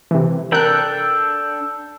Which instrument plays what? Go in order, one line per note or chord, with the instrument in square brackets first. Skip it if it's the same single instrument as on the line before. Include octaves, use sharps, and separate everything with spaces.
[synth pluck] C3 E3
[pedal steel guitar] D4 A4 G5 [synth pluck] A#4 F#6